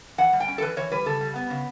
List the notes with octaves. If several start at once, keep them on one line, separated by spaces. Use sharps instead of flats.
E3 F#5
G3
G5
C#4
A4
E3 B4
E3 C#5
G3 B4
C#3 A4
G3
B3
C#3